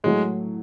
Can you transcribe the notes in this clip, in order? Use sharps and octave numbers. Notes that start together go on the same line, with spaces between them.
A2 F#3 G#3 A3